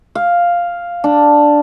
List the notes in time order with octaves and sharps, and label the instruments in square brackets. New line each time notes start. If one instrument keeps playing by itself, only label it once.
[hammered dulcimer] F5
D4